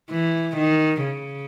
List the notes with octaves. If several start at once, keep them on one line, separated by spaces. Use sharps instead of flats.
E3
D#3
C#3